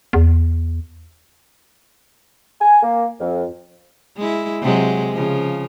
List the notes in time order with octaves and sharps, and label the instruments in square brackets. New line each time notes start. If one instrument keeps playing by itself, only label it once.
[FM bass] E2
[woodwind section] G#5
A#3
F2
[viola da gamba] G#3 E4
C3 F#3 G#3
C#3 F3